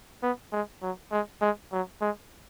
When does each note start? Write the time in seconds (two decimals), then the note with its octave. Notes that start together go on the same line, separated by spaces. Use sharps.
0.23 B3
0.52 G#3
0.82 F#3
1.12 G#3
1.41 G#3
1.72 F#3
2.01 G#3